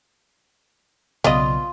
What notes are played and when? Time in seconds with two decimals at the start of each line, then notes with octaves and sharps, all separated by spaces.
1.24 B1 C#3 B3 F4 D5 D#5